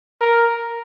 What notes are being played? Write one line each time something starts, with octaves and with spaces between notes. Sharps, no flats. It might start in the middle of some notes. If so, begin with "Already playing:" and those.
A#4